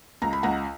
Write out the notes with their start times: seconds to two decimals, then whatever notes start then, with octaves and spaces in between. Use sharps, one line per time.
0.22 C#2 A#5
0.33 B5
0.43 C#2 F#5 A#5